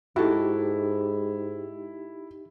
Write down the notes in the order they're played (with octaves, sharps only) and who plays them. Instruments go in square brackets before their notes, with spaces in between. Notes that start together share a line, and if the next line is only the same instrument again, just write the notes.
[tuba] G#2 [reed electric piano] D#4 G4 [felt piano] E4 [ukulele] F#4 A4